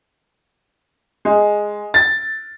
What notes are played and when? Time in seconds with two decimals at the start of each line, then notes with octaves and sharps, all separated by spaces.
1.25 G#3
1.94 A6